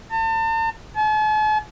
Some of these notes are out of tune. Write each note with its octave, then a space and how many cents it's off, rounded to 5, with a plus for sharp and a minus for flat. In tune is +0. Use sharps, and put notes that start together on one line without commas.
A5 +40
A5 -45